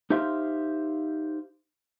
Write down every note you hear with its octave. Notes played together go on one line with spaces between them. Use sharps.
D#4 G4 C5 E5 F5 C6